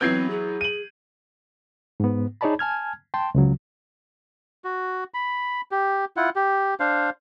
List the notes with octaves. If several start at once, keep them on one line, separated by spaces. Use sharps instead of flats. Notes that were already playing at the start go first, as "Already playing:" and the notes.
E3 F#3 B3 C4 G6 G#6 C7
G#4
D#7 F#7
G#2 B3
D#4 G#4 C#5 D5 A5 B5
G#5 A5 F6 G#6
G5 A5 C6
C#2 C#3 F#3
F#4
B5
G4
E4 F4 F#5
G4
D4 C5 F5